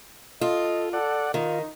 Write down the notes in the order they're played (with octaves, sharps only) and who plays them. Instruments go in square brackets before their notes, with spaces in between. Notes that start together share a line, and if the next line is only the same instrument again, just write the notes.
[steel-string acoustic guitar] F4 [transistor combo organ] A4 [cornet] D#5
[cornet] A4 [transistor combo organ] D5 F#5
[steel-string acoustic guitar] D#3 [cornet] D#4 [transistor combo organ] F4